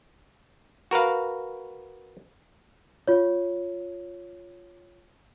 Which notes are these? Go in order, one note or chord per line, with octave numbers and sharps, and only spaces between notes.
F#4 A#4 B4 F5
F4 C#5